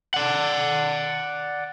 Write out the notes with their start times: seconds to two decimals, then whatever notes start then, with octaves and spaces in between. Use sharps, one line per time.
0.14 D5 F#5